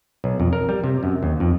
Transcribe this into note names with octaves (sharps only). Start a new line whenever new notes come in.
B1
F2
A#4
G3
C3
F#2
D#2
F2